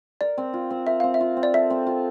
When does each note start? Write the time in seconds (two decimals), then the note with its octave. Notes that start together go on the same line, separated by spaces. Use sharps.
0.21 A#4 D5
0.38 C4
0.53 F4
0.70 C4
0.87 A#4 E5
1.00 C4 F5
1.14 E5
1.20 F4
1.37 C4
1.43 D5
1.53 A4 E5
1.70 C4
1.86 F4